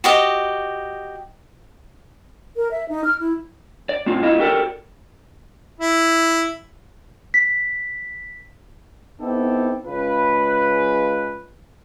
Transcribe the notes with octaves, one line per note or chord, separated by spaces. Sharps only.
F#4 G4 D#5
A#4
E5
D#4
F6
E4
D5
A2 C4 F4
A3 E4 F4 D#5
F#4 G4 A4 A#4 D5
E4
B6
B3 C4 D#4 E4 G4 A4
C#3 G#3 F4 B4